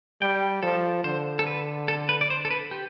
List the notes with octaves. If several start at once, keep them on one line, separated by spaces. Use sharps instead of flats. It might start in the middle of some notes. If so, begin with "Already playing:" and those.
G3 G5
F3 A4
D3 C5
A4
B4
A4
B4
D5
C5
A4
B4
G4